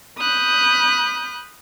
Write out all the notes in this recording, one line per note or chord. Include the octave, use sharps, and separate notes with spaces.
B5 D#6 F#6 G6